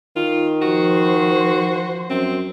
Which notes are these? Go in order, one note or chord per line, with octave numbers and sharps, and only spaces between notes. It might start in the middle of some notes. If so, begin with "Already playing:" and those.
D#3 F4
F3 F#4 C5
F#2 C4